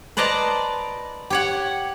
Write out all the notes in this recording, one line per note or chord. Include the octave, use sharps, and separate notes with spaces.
B4 C5 D5 D#5 A5 A#5
G4 C#5 F#5